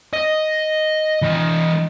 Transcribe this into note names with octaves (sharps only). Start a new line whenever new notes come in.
D#5
E3 D#5